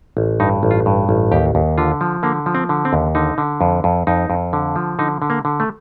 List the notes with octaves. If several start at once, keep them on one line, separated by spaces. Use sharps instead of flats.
A1
G2 D#4
A1
F4
G2
A1
D#2 G4
D#2
D3 F4
F3
D3 A#3
F3
C4
D3
C4
D#2
D3 D#4
D3
F2
F2
F2 D#4
F2
D3
F3
D3 D#4
D3
A#3
D3
A3